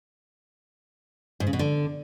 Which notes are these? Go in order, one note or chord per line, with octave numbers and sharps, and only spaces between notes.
G#2
C#3
B2
D3